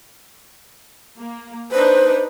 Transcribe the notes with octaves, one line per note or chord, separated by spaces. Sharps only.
A#3
D4 D#4 B4 C5